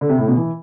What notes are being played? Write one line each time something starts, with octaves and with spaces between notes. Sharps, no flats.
D3
C3
A2
B2
E3